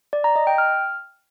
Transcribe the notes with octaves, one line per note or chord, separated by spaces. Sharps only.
D5
A#5
D#5
G5
F6